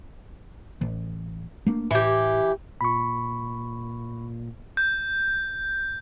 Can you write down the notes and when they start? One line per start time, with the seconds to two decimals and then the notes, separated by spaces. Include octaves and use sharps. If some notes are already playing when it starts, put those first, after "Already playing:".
0.81 A1
1.66 A3 A#3 D4
1.91 A2 E3 G4
2.81 A#2 B5 C#6
4.77 G6